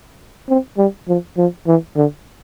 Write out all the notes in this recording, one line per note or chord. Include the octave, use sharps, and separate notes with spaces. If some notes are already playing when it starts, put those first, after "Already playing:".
C4
G3
F3
F3
E3
D3